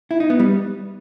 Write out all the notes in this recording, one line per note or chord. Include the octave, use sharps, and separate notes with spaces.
E4
D#4
B3
G3